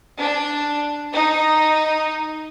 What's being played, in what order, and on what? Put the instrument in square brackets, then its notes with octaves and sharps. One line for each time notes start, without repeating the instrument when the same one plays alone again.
[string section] D4
D#4